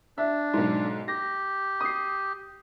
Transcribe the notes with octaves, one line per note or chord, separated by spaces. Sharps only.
D4 E5
B1 G#2
G4 A#6
D#6 C7